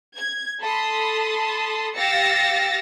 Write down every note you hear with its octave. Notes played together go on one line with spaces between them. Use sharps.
G#6
A4 A5 B5 C6 D#6
G4 F5 E6 A6 A#6 C#7